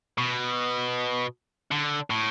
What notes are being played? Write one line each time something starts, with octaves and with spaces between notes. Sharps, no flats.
B2
D3
A2